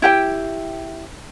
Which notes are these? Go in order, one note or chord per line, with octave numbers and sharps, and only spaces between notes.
E4 G4 G5